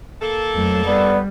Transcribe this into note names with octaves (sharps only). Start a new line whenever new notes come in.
A#3 A4
F2 F#3 A3
G3 B3 D5